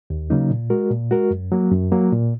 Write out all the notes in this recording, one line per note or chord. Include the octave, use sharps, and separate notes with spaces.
D#2
C#3 F#3 A#3 D#4
A#2
G#3 F#4 A#4
A#2
G#3 F#4 A#4
F#2
F#3 A#3
F#2
F#3 A#3
A#2